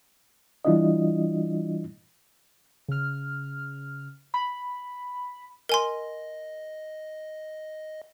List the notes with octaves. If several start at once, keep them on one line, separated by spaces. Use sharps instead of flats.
E3 G3 D4 E4 F4 D#5
C#3 F6
B5
A#4 D#5 G#5 C6